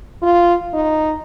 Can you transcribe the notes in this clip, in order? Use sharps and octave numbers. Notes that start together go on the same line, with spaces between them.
F4
D#4